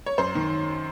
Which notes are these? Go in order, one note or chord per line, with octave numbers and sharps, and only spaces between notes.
C#5
F#2 C5
D#3